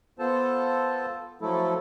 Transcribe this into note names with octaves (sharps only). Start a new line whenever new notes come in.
B3 F4 A4 C5 A5
F3 F#3 A3 E4 A4